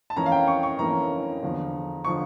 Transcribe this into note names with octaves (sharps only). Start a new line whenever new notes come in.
A5
F2 E3 A#3 C#4 A#5
F5
G5
C#6
C#6
F2 E3 A#3 C#4 A#5
E2 D3 F3
D3 F3 C#6